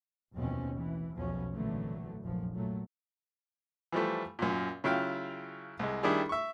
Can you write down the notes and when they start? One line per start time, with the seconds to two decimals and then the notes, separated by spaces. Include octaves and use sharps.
0.35 F1 D#2 B2 E3 C4 C#4
0.71 A1 E3
1.14 B1 E2 B2 F3 C#4
1.53 G#1 A#2 D3 E3 F#3 A3
2.22 F1 A#1 F#2 F3
2.55 A#2 F#3 A3
3.92 E3 F3 G3 A3
4.39 F#2 A#2
4.84 C#3 F#3 E4 F4 F5 G5
5.79 C2 G#3
6.03 D#3 G3 D4 E4 G#4
6.29 E5 C#6